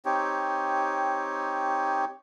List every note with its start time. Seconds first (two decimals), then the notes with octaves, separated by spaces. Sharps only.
0.05 C4 D#4 G4 C#5